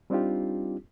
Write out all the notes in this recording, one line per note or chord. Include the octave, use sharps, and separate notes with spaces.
G3 C4 D4 D#4 F4 G4